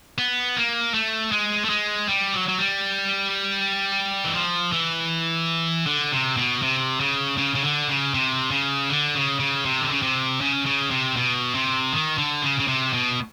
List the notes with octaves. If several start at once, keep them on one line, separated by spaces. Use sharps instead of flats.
B3
A#3
A3
G#3
A3
G#3
G3
F#3
F#3
G3
E3
F3
E3
D3
C3
B2
C3
C#3
C#3
C#3
D3
C#3
C3
C#3
D3
C#3
C#3
C3
D3
C#3
C3
C#3
C#3
C3
B2
C3
D#3
D3
C#3
C#3
C3
B2